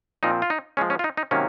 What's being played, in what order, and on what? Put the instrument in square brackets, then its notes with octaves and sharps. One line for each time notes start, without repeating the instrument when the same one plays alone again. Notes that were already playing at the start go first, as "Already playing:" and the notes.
[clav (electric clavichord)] A#2 F3 C4 D#4
F4
D#4
F3 G#3 C#4
C#4
F4
D#4
D#4
C3 D#3 F#3 A#3 C#4